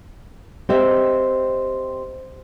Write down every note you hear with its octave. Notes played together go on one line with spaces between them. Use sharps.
C4 G4 D#5 E5